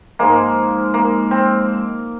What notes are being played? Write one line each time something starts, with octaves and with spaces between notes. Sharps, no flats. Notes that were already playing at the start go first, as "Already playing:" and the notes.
G#2 F3 G#3 A#3
A#3
C4